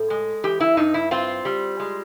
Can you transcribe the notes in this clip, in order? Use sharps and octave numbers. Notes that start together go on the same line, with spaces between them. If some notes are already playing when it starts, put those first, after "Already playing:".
Already playing: A2 A4
G#3
E3 G4
E4
G2 D#4
E4
C4 F4
G3
G#3